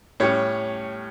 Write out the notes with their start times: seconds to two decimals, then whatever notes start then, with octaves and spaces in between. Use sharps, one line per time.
0.20 A2 G3 C#4 C#5